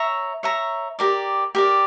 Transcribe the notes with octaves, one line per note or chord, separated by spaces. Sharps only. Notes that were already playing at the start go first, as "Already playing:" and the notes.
Already playing: C#5 E5 A#5
C#5 E5 A#5
G4 A#4 D5
G4 A#4 D5